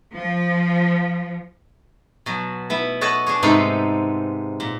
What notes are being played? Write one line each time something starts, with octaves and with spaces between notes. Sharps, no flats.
F3
B2 F#3
B3 E4
A4 C#5 D#5 F#5 A5
D4 G#4 C#5
G#2 C3 B3 D#4 A4 C5
A#2